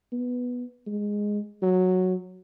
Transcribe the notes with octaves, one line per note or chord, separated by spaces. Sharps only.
B3
G#3
F#3